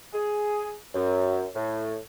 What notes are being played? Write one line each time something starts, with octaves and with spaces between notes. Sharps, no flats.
G#4
F#2
A2